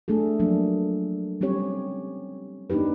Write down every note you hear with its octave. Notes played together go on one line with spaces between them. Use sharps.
A3 D4 G#4 A4
F3 F#3 A#3 D4
G3 C4 C#4 G4 C#5
A#3 D4 D#4 G4 B4